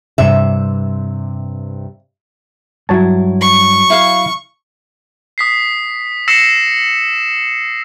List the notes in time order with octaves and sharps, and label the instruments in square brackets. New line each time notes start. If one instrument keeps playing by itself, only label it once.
[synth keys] G2 C3 [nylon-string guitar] E5
[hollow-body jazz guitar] G2 E4 [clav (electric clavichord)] F#3 C#5 A5
[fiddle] C#6
[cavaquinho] E4 F5
[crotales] D#6 B6 C7
E6 A#6 C7 C#7 E7